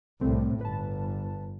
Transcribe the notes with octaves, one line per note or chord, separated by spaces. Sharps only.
C2 A2 A3 C4
G1 B4 A5